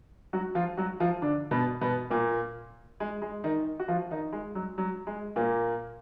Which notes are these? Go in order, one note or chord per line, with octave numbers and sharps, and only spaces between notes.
F#3 F#4
F3 F4
F#3 F#4
F3 F4
D3 D4
B2 B3
B2 B3
A#2 A#3
G#3
G#3
D#3 D#4
F#4
F3 F4
D#3 D#4
G#3
F#3
F#3
G#3
A#2 A#3